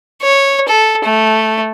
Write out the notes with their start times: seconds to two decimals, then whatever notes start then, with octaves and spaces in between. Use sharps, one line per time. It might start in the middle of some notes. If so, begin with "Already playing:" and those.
0.23 C#5
0.68 A4
1.05 A3